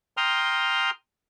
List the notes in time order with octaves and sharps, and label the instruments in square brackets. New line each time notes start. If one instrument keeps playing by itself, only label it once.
[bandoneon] G5 A#5 C6 D#6 F6